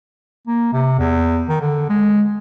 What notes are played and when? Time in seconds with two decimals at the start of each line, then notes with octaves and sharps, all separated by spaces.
0.47 A#3
0.73 C3
0.99 E2
1.49 D#3
1.61 D3
1.89 G#3